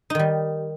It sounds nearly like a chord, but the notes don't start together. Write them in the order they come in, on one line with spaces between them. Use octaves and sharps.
D#4 D#3 G3